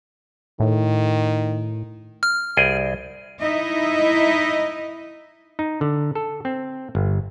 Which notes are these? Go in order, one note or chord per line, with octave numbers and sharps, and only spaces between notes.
A2 D#3
F6
C2 G#4 G5
D#4 E4 D#5 E5
D#4
D3
A4
C4
G1